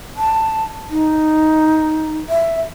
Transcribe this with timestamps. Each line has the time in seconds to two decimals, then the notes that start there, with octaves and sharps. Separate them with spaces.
0.17 A5
0.90 D#4
2.29 E5